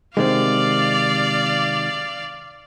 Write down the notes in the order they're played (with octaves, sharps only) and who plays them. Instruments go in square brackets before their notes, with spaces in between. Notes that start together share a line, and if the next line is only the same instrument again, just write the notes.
[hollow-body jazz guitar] C3 D#3 G#3 [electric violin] D5 F5